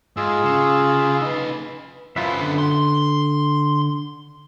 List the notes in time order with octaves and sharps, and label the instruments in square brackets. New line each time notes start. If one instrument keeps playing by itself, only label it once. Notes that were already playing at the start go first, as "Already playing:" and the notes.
[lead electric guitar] G#2 [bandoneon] F4 G#4 E6
[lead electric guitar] C#3
D#4 B4
[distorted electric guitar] F#2 B3 [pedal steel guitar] E4 F4 E5
[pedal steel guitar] D3
[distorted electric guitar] C6